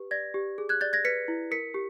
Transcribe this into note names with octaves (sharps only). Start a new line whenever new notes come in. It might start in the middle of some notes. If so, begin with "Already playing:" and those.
Already playing: G4 B4
D5 G#6 A#6
G4
G#4
F#6 G#6
D5 G6 A6
G#6 A#6
B4 B6 C#7
E4
A#4 B6 C#7
G4